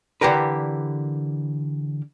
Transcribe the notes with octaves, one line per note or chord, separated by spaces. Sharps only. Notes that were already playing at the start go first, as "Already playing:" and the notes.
D3 E3 G4 A#4 B4